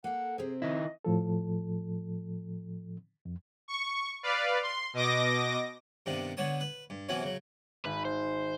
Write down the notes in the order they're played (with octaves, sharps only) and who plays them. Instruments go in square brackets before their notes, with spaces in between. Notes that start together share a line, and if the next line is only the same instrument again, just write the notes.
[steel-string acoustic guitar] A#3 A4 [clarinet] F#5
[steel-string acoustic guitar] C3 C4 [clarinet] G#4
[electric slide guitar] D#3 E4 [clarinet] D#5
[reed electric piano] A2 F3 A4
F2
[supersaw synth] C#6
B4 D5 F5
C6
B2 D#5 D6 A#6
[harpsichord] G2 C3 D#3 B3 D4
D3 B3 C#5 A5 D#6
B4
G2
C3 E3 F#3 B3 C#4
C#3 F#3
[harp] G#1 [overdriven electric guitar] B4
[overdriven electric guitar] C5